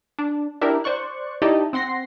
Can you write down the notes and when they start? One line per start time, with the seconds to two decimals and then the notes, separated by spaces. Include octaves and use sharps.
0.19 D4
0.61 D4 E4 G4 A#4
0.84 C5 D5 C#6 F#6
1.42 D#4 E4 G4 D5 D#5 A5
1.73 C4 F#5 C6 A#6 C7